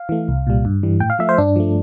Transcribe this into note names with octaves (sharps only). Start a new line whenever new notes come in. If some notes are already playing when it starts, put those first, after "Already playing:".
Already playing: F5
E3 A3
C2
A#2 G3
G2
E3 G3
A2 G5
F5
F3 A3 E5
C5
G2 D4
F3 A3